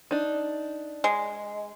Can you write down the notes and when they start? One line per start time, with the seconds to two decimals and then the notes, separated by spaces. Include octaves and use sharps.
0.11 D4 D#4
1.04 G#3